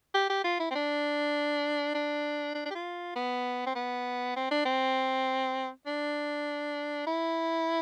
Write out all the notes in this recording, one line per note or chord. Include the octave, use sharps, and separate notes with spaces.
G4
G4
F4
E4
C4
D4
D4
D4
D4
G4
F4
B3
C4
B3
C4
D4
C4
D4
E4